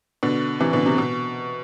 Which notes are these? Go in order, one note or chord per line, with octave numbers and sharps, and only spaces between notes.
B2 D3
C3 E3
B2 D3
C3
B2